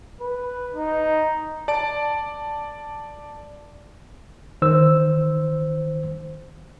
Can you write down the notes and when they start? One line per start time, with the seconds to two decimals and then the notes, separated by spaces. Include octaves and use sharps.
0.21 B4
0.74 D#4
1.68 D5 A5 D7
4.62 D#3 C5 E6